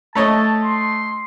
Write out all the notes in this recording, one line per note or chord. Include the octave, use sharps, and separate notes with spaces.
A3 C#5 D#5 A5
C6